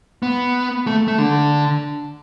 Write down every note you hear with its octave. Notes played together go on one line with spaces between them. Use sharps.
B3
A3
A3
D3